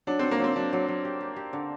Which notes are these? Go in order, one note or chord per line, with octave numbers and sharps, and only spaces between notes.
F#3 D4
C4 F#4
A#3
F#3 C4
F#3 D4
F#3
F#3
G4
G4
G4
D3